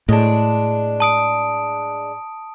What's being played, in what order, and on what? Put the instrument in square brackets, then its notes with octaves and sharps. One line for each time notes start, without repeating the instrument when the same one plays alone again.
[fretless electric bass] A2 [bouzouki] G#3 D4
[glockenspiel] A5 D#6 D7